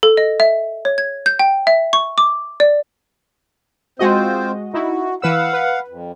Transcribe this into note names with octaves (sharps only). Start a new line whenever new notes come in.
A4
D#5
E5
C#5
G#6
G6
G5
E5
C#6
D6
D5
G#3 C4 F4 F#4 C5 D#5
D#4 E4 F#4
E3 B4 F5 F#5 E6
B4
F2